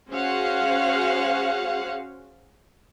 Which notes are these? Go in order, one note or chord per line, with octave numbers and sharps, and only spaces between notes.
C#4 F#4 G#4 C5 F5 F#5